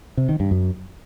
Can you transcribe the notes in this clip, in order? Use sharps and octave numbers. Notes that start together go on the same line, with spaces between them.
C3
D#3
G2
F#2